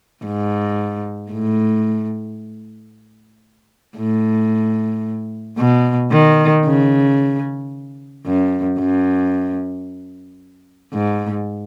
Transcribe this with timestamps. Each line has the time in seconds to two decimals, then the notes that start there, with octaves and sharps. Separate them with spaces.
0.25 G#2
1.32 A2
3.98 A2
5.58 B2
6.12 D#3
6.65 C#3
8.26 F#2
8.78 F#2
10.93 G#2